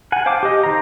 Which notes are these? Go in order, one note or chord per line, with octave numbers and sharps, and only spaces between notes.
F#5 G#5
C5 F5 G5 A5 D6
G4 D#5
D#3 C5 A#5